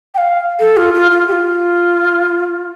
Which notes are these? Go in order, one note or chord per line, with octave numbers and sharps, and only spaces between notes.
G5
F5
A4
F4
F4
F4
G4
F4